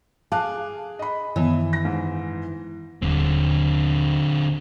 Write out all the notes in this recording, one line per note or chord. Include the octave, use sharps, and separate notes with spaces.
G#4 F5 A5 D6 F#6
D#5 B5
F#2 D#3 E3 B3
A#6
G#2
D#1 D3 C4